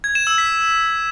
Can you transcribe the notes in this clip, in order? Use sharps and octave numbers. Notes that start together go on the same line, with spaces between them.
G#6
E7
E6
B6